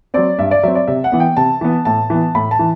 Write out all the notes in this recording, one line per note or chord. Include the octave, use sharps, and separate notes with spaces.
F#3 C4 D5
G2 E5
D5
F#3 C4 E5
D5
C3 E5
F#5
E3 B3
G5
C3 A5
E3 B3
A2 A5
E3 B3
A2 B5
A5
E3